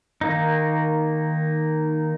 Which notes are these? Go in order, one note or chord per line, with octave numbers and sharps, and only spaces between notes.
D#3 A#3 D#4